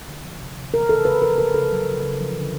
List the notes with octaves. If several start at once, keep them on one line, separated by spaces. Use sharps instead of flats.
D3
F3
C3
C3
E3 A#4
C#3 A4
C#3 B4
F3 A#4
C#3 A#4
C#3 A4
F#3
C#3
C#3
F3
D3